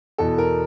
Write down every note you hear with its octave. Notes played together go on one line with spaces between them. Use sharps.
E2 B2 A4
A#4